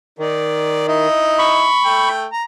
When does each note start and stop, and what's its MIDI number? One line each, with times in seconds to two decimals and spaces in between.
0.19 1.08 51
0.19 0.87 63
0.19 0.87 74
0.88 1.68 63
0.88 1.68 64
0.88 1.68 75
1.39 2.09 83
1.39 2.09 85
1.84 2.25 57
1.84 2.25 79
2.32 2.43 82